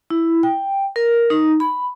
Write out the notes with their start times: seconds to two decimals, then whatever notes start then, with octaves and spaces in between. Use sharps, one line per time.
0.10 E4
0.43 G5
0.96 A#4
1.30 D#4
1.60 B5